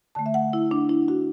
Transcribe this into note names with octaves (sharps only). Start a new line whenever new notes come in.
D3 A3 A5
E5
F#5
E4
D4
E4
F#4